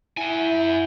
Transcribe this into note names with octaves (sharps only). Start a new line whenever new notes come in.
E4 F#5 G#5